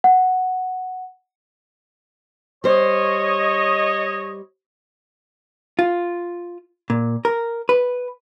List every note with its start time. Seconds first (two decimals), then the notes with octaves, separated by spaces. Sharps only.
0.04 F#5
2.64 G3 C5 C#5 D#5
5.79 F4
6.90 A#2
7.25 A#4
7.69 B4